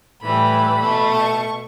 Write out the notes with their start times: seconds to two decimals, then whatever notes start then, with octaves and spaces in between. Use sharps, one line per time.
0.21 A2 E3 G3 B5
0.81 B2 A3
1.11 C#6